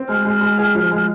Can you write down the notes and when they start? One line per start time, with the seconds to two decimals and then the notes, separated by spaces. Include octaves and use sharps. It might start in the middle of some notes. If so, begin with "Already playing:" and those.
Already playing: C4
0.09 G#3 F6
0.25 G#3
0.41 G#3
0.58 G#4
0.75 F3
0.92 G#3